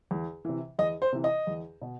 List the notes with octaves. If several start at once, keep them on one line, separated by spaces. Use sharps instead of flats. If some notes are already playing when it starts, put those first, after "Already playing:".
E2
C3 E3
E2 D#5
C5
C3 E3
D#5
E2
B2